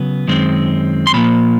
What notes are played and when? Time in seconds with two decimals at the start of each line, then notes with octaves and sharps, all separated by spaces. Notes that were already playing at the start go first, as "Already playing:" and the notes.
Already playing: C#3 F#3 B3
0.28 F#2 D#3 G#3 C4
1.07 C6
1.14 A#2 F3 A#3 B5